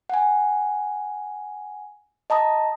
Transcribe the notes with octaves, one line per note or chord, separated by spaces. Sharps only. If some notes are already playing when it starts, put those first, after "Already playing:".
F#5 G#5
D#5 A5 A#5 D#6